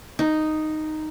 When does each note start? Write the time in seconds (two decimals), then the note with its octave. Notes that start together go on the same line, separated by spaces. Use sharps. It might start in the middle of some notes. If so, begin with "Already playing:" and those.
0.19 D#4